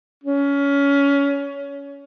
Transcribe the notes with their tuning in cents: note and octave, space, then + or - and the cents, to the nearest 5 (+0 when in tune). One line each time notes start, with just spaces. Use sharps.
C#4 +20